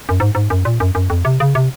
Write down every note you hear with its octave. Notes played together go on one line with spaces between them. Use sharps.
F#2
G#2
G#2
F#2
A#2
F#2
F#2
F2
C3
C#3
C3